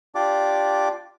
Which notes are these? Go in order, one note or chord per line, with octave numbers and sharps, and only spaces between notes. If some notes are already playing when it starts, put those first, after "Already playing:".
D4 F4 G4 D5 D6